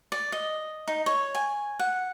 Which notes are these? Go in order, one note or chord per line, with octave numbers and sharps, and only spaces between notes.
D5
D#5
D#4
C#5
G#5
F#5